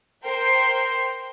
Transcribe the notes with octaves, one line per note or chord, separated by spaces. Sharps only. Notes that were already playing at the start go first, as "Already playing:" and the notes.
A#4 C5 G5 C6